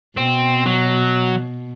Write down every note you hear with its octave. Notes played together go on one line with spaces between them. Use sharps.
B2 C4
F#3